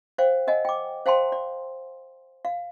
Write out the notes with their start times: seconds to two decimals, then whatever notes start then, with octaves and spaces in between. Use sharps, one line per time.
0.18 C5 D5 F5 G5
0.47 A#4 D#5 F#5 G#5
0.65 G5 D6
1.06 C5 F5 G5 A5 C6
1.32 D5
2.45 F5